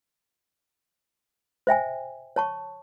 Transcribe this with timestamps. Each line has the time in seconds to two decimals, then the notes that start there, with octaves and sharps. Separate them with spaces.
1.67 C5 E5 G5 G#5
2.36 C#5 A5 C#6